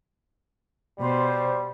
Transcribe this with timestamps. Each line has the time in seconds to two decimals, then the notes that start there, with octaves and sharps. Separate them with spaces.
0.99 B2 G3 C5